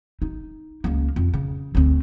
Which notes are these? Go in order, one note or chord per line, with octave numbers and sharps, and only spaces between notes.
D#4
C#2 A#3
F2
C#3
D2 C4